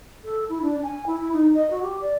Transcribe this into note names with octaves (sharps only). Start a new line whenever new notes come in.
A4
E4
D4
G#5
E4
D#4
D#5
F#4
G4
D5